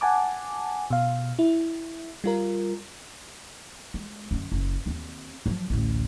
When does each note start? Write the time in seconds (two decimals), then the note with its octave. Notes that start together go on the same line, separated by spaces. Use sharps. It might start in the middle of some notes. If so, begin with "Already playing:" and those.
0.01 F#5 G#5 A5 D6
0.90 B2 F5
1.39 E4
2.24 G3 F4 A#4
3.94 G#3
4.31 F#2 D3
4.52 F#1
4.86 D#2 C4
5.46 F3 F#3
5.70 A1 D2